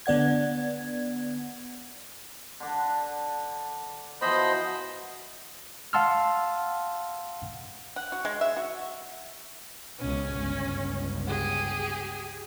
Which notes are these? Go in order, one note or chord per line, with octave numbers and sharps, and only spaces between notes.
D3 B3 D5 F#5 G#6
D3 D4
B2 E3 F3 C5 D#5 B5
F5 F#5 A5 C6 E6 F6
F#5
F#4
G#3
E5
F#4
C#2 B2 C#4
G1 C#2
G4 G#4